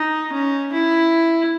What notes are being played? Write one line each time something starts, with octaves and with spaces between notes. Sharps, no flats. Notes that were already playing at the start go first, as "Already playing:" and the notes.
Already playing: D#4
C#4
E4